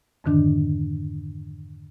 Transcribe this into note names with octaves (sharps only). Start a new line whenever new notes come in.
F2 G#2 D3 D#3 D4